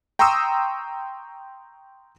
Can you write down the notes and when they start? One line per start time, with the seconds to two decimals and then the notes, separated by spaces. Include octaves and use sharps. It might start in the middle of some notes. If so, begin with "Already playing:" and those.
0.19 G5 A#5 C6 C#6 D#6 E6